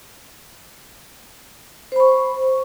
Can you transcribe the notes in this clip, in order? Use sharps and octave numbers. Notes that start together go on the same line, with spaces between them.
C5 B5 C#6